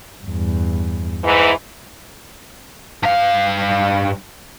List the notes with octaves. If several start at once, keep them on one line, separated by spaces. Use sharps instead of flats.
E2 G2
G#2 E3
G2 F5